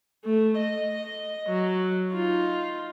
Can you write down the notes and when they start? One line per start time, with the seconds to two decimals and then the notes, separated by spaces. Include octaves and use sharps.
0.25 A3
0.59 D#5
1.49 F#3
2.13 D#4 F4